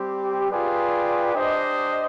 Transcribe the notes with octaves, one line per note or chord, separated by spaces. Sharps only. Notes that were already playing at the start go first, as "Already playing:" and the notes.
Already playing: G3 C4 G4
F4 G#4 B4 D5 G5
D4 G4 C5 D#5